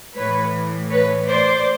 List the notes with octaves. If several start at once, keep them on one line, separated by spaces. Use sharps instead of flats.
A2 E3 B4 C#5
B4 C#5
C5 D5